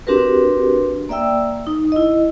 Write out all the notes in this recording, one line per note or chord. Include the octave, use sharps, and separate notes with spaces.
C4 D4 F#4 G4 A#4 B4
A#3 D5 E5 G5 E6
D#4
E4 D#5